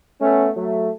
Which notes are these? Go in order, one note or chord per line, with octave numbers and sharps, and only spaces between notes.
A3 B3 C#4
F#3 A3